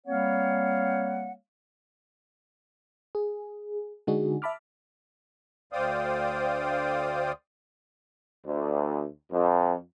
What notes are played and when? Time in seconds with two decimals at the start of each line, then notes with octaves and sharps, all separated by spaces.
0.07 G3 A#3 C4 C#5 F5 F#5
3.15 G#4
4.07 D3 G#3 D4 D#4 F#4 G#4
4.42 E5 A5 B5 D6 F6
5.73 D2 C5 D5 F5 G5 D#6
8.46 D2
9.31 F2